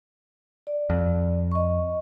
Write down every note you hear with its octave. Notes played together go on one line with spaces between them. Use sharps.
D5
F2
D#5 C#6